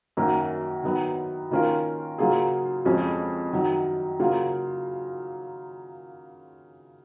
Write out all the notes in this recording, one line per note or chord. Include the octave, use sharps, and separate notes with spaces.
F#2 D#3 A#3 C#4 F#4
D#3 F#3 B3
D#3 A#3 C#4 F4 A#4
C#3 F#3 A#3 F4 G#4
F2 F3 G#3 C#4
F#2 D#3 F#3
C#3 F#3 A#3 F4